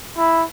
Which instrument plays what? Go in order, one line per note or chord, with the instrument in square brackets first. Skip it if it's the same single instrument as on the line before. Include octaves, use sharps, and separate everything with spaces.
[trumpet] E4